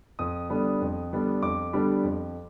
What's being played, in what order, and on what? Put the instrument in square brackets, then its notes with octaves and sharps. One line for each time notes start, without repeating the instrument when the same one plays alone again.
[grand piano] F2 D#6
D3 G3 B3 D4
F2
D3 G3 B3 D4
F2 D6
D3 G3 B3 D4
F2